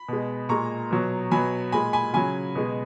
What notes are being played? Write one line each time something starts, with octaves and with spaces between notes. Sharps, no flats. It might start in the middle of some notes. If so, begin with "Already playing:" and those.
Already playing: B5
B2 G#3
A#2 G#3 A#5 C#6
B2 F#3
B2 F#3 G#5 B5
A#2 G#3 G#5 B5
G#5 B5
C#3 F#3 G#5 B5
B2 G#3